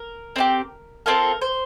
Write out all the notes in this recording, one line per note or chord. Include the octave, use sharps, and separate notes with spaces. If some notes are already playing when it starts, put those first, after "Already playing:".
Already playing: A#4
C4 D#4 G4
C4 F4 A4 A#4
C5